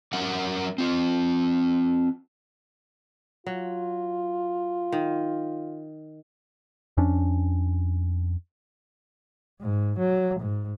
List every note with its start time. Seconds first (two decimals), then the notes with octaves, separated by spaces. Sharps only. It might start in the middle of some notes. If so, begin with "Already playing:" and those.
0.13 F#3 C#4 A#4 E5 F#5
0.78 C4 F4
3.46 F#3 F4
4.92 D#3
6.97 F2 C#4 D4
9.61 G#2
9.99 F#3
10.40 G#2